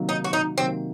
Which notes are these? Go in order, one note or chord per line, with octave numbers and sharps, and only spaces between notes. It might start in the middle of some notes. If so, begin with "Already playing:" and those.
Already playing: C3 D#3 F#3 A#3
D#4
F#4
D#4
C3 D#3 F#3 A#3 C4